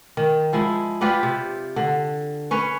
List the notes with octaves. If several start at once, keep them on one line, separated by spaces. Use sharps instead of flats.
D#3
F3 G#3 E4
F4 G4 B4 D5
C3
D3
C#4 B4 C#5